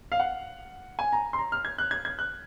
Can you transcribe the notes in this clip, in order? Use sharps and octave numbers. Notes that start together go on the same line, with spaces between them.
F5
F#5
G#5
A#5
C6
A#5
F6
G#6
F#6
G#6
G#6
F#6